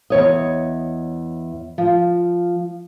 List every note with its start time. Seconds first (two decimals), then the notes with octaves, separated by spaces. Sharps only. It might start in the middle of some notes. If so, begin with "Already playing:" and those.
0.10 E2 C#5 D#5
1.78 F3